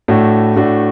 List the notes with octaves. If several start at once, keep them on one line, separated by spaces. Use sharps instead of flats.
A2 A3 D4 F#4
A2 A3 D4 F#4